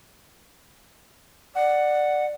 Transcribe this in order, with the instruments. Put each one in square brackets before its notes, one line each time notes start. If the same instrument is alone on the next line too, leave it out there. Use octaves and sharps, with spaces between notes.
[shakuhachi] D5 [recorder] F#5